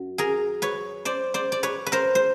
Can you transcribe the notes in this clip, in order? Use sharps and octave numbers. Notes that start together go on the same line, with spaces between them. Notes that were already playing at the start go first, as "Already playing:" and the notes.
Already playing: F#2 F#4
G#4 A#4
B4 C#5
C5 D5
C5 D5
D5
B4 C#5
B4
A#4 C5
C5